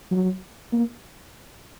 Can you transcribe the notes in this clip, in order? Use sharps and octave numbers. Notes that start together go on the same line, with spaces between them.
F#3
A#3